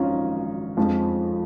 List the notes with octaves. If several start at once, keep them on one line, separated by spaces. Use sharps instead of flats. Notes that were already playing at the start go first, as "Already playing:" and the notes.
Already playing: G#1 F#2 F3 C#4 D#4 F4
F2 F3 G#3